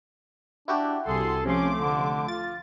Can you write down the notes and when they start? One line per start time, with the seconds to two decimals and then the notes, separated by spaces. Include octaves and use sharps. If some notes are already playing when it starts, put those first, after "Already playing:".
0.68 D4 E4 F#4 G4
1.06 C2 G#4 A4 C6
1.45 C3 F3 A3 C#4 C6 D6
1.78 D3
2.28 F4 A6